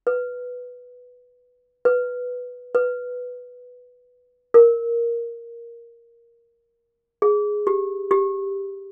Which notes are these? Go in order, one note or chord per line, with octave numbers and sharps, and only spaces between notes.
B4
B4
B4
A#4
G#4
G4
G4